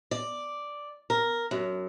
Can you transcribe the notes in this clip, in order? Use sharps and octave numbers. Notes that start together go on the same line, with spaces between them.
D5
A#4
F#2